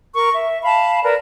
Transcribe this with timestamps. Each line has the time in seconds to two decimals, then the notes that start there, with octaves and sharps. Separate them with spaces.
0.15 A#4 C#6
0.33 E5
0.64 F5 A5 B5
1.05 A#4 B4 D5